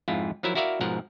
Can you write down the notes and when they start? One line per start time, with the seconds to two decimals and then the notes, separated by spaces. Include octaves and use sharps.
0.08 F2 G#2 E4 F4
0.43 F3 F#3 E4 A#4 E5
0.55 E4 F#4 A#4 D5 E5 F5
0.81 G#2 B2 F3 A#4 F#5